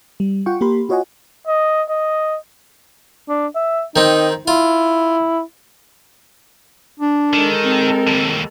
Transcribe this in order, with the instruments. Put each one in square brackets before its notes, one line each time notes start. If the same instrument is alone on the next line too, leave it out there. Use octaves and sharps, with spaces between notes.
[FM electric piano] G3
F4 F#5 G5 C#6
A#3 G4 A#4 B5 C6
F4 F#4 C#5 D#5 F#5 G#5
[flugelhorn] D#5
D#5
[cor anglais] D4
E5
[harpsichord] D#3 C4 [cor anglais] D#4
[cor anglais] E4 [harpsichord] F4
[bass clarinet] D4
[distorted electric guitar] D#3 [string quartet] G#3 A4 A#4
[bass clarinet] C4
[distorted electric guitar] D#2 A2